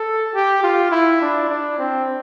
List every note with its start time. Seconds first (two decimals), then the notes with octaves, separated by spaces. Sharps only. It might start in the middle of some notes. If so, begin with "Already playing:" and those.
Already playing: A4
0.34 G4
0.63 F4
0.91 E4
1.22 D4
1.50 D4
1.78 C4